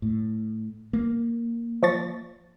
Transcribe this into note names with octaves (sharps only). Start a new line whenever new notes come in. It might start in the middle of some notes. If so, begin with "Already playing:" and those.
A2
A#3
F3 C#6 A6